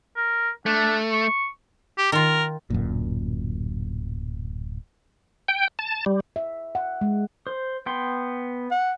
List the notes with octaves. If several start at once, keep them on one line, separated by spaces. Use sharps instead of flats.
A#4
A3 D4
C#6
G4
D#3 F4 A#4
D1 F#2 A#2
G5
A5
G3
E5
F#5
G#3
C5
B3 G5 C6
F#5